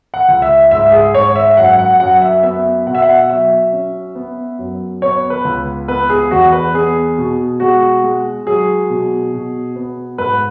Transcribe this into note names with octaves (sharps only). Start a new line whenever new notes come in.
F#5
C#2
E5
G#2 E5
G#4
G#2 C#5
E5
F#2 F#5
F#5
F#2 F#5
E5
B3 E5
B2 F#5
E5
F#5
F#3 E5
C#4
B3
F#2
B3 C#5
B4
C#2
B3 B4
G#4
E2 F#4
B4
B3 G#4
B2
G#3 F#4
G#3
F#3 G#4
B2
B2
B3
G#2 B4